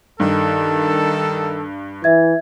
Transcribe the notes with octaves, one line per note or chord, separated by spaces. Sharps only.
G2 D#3 A4
E3 E5 G#6